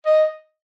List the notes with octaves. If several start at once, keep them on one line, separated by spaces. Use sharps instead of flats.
D#5